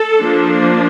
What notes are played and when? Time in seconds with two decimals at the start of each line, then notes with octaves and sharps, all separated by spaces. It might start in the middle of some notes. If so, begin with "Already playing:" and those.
Already playing: A4
0.19 F3 A#3 D4